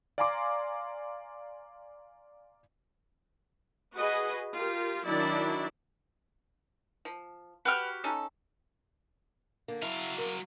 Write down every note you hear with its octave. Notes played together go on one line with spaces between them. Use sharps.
D5 F5 G#5 A#5 C6 D6
F#4 G#4 B4 D#5
F4 G4 A#4
D#3 F#3 D4 E4 D5
F3
F#4 G4 B4 F6
C#4 D#4 A4
D3 A#3
F#3 E4 F5
A#4